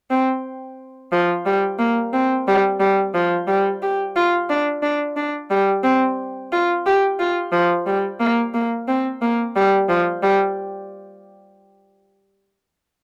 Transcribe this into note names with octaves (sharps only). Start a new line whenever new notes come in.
C4
F3
G3
A#3
C4
G3
G3
F3
G3
G4
F4
D4
D4
D4
G3
C4
F4
G4
F4
F3
G3
A#3
A#3
C4
A#3
G3
F3
G3